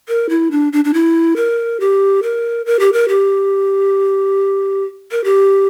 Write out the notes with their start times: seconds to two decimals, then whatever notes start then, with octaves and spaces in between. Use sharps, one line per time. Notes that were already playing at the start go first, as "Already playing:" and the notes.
0.08 A#4
0.29 E4
0.51 D4
0.73 D4
0.84 D4
0.94 E4
1.36 A#4
1.80 G4
2.22 A#4
2.66 A#4
2.79 G4
2.93 A#4
3.08 G4
5.11 A#4
5.24 G4